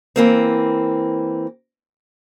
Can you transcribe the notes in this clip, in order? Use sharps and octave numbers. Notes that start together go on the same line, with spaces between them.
E3 A#3 C4